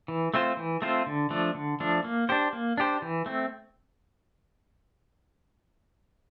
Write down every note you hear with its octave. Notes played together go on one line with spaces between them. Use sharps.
E3
A3 C4 F4 C5
E3
A3 C4 F4 C5
D3
F3 A3 D4
D3
F3 A3 D4
A#3
D4 G4 C5
A#3
D4 G4 C5
E3
A3 C4